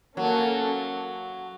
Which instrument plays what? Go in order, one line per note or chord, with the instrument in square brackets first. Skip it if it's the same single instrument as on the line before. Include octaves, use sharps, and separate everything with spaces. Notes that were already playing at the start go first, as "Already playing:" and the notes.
[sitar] F#3 [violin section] A#3 C#4 A4